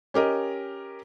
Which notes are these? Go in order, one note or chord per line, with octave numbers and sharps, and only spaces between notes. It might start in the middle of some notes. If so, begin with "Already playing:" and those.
C#4 G4 A#4 D#5